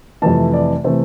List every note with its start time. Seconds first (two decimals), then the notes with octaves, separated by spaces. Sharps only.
0.22 F2 C3 E3 A3 A5
0.54 D5
0.84 C3 E3 A3 C5